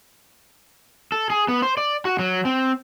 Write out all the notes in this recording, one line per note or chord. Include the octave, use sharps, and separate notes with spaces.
A4
G#4
B3
C5
D5
F#4
F#3
C4